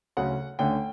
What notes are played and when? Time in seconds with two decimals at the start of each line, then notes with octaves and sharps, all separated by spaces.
0.17 D2 C#3 F#3 C#4 F#5
0.59 D2 D3 A3 C#4 G5